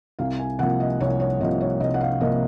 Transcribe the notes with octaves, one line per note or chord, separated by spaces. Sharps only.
C2 F5
G#5
C3 F3 A#3 F#5
D#5
C2 C#5
C#5
C3 F3 A#3 D#5
C#5
C2 D#5
F#5
F5
C3 F3 A#3 D#5